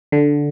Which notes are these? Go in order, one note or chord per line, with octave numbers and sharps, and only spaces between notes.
D3